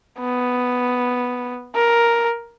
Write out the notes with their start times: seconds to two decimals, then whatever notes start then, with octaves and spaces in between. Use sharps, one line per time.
0.20 B3
1.75 A#4